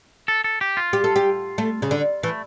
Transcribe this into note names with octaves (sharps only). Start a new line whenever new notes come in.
A4
A4
G4
F4
G4
A4
G4
A3
C#3
D3
E3 A3